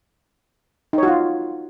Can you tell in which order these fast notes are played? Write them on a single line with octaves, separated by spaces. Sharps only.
D#4 C#5 F#4 F4